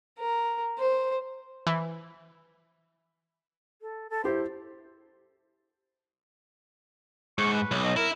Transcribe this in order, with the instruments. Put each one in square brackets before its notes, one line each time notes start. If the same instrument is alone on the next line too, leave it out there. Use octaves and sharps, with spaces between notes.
[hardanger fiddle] A#4
C5
[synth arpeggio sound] E3
[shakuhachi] A4
A4
[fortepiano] E4 G4 [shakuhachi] C5
[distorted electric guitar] G#2 [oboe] C#6
[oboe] B4
[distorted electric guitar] B1
[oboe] D#5
[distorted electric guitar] E4 [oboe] A#4